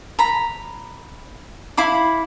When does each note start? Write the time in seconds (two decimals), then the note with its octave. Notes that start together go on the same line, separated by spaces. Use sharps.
0.19 A#5 B5
1.77 E4 F5 B5 D6